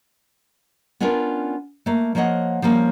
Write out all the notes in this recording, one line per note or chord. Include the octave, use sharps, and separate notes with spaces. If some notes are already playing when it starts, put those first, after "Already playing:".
B3 C#4 D4 F4 A#4
A3 A#3
F3 A#3 C#5 D#5 F#5
F3 G3 A#3 C#4